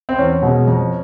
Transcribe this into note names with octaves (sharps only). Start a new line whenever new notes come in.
C4
E2 C#4
B2 G#3
F2